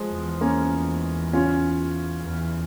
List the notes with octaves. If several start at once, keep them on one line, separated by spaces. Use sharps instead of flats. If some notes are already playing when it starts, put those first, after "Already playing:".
Already playing: F3 G#3
E2
A#3 C#4
C#4 F4
E2